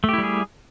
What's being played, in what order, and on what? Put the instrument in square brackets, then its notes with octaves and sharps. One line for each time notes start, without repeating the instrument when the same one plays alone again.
[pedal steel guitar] A3
G4
E4
G3
G#4